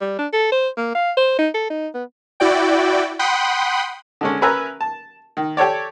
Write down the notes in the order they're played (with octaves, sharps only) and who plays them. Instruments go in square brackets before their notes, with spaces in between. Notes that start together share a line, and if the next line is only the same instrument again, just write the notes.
[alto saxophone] G3
D4
A4
C5
A#3
F5
C5
D#4
A4
D#4
B3
[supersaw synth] E4 F#4 D5 G5
F#5 G5 B5 C6 D#6
[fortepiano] D3 G#3 C#4
C#4 A#4 B4 E5 G#5 A#5
A5
D#3
G4 A4 C#5 D5